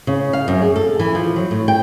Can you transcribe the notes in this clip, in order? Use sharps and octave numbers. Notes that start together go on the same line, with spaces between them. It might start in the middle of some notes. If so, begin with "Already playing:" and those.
C#3
F5
F#2
G#4
A4
E3
F3
F#3
A2
G5